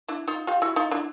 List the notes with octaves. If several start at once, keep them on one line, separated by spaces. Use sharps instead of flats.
D4 E4
D#4 F4
F4 G4
E4 F#4
D#4 F4
D4 E4